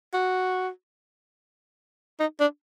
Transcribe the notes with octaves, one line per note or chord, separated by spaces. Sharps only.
F#4
D#4
D4